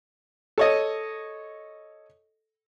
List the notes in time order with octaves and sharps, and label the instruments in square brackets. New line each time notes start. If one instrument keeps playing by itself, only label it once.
[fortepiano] A4 C#5 D#5